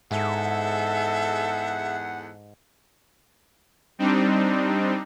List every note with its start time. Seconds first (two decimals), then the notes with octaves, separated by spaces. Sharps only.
0.11 E2 G#2 G#4 A4 E5 F#5
3.98 G3 C4 D4 D#4